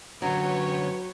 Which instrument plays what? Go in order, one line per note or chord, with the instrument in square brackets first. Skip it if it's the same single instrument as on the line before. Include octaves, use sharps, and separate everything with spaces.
[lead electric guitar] F#2 D3 [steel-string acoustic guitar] F#3 [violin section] B4 C#5 G5